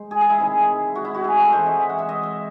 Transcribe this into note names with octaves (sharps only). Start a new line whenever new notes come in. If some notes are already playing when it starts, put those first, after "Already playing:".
Already playing: G#3 C5
G#4
G#4
E4
C3 D#3 G#3
F#4
E4
F#4
G#4
A4
C3 E3 G#3 C5
D#5
E5
F#5
E5
D#5
E5